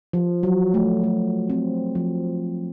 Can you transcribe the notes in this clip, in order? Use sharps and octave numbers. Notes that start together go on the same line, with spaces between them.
F3
F#3
A3
A3
C4
F3